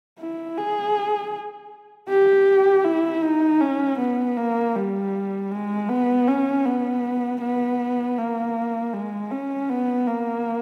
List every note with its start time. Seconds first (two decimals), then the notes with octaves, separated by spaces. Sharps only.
0.19 E4
0.57 G#4
2.09 G4
2.85 E4
3.23 D#4
3.60 C#4
3.99 B3
4.37 A#3
4.75 G3
5.51 G#3
5.89 B3
6.27 C#4
6.65 B3
7.41 B3
8.17 A#3
8.93 G#3
9.31 C#4
9.69 B3
10.07 A#3